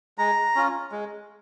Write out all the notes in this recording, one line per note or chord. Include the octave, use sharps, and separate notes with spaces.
G#3 A#5
C#4 F4
G#3